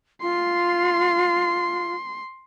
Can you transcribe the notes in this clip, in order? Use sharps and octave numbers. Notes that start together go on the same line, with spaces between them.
F4 C6